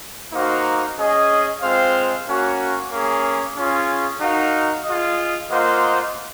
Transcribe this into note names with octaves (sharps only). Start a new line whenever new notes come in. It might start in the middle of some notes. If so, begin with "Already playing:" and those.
A#3 D#4 F#4 C5 F5
C#4 G#4 D#5
G#3 C4 F4 C5 F5
A#3 C#4 F#4
A#3 C#4 G#4
C#4 F4 G#4
D#4 F#4 A#4 F5
F4 G#4 D#5
A#3 F4 C5 D#5 F#5